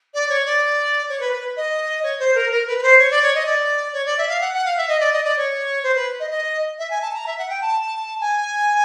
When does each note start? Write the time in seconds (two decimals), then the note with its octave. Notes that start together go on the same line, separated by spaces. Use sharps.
0.13 D5
0.28 C#5
0.45 D5
1.09 C#5
1.19 B4
1.32 B4
1.56 D#5
2.03 C#5
2.19 C5
2.34 A#4
2.50 A#4
2.67 B4
2.78 B4
2.82 C5
2.98 C#5
3.10 D5
3.22 C#5
3.34 D#5
3.45 D5
3.93 C#5
4.05 D5
4.17 E5
4.28 F5
4.40 F#5
4.53 F#5
4.65 F5
4.77 E5
4.88 D#5
4.99 D5
5.12 D#5
5.24 D5
5.36 C#5
5.83 C5
5.95 B4
6.19 D#5
6.30 D#5
6.78 E5
6.90 G#5
7.01 A5
7.13 A#5
7.26 E5
7.38 F#5
7.49 G5
7.61 A5
8.20 G#5